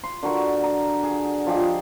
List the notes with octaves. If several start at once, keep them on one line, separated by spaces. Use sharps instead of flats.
C6
D3 F#4 A#4 C#6
A#5
G#4
F3 G4 G#4 D#5